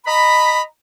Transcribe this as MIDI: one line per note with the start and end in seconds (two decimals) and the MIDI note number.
0.05 0.62 75
0.05 0.62 82
0.05 0.62 83